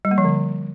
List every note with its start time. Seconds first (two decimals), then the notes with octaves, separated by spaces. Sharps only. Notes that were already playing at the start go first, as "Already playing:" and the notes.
0.05 G3
0.11 A#3
0.18 F3
0.24 D3